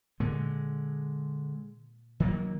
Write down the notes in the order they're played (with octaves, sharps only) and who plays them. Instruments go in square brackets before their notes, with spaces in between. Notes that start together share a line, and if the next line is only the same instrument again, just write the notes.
[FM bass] A#2 [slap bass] D3 G#3
[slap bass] D#3 F#3 A#3